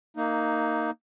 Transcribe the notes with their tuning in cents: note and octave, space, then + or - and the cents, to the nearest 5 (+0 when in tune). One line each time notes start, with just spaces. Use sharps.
A#3 -10 D#4 +0